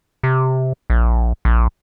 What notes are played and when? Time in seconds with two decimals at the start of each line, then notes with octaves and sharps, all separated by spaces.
0.23 C3
0.90 A#1
1.45 A#1